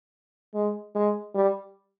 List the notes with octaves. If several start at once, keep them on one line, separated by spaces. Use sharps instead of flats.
G#3
G#3
G3